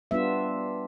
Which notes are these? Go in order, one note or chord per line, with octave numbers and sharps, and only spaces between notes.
G3 B3 D4 F4 E5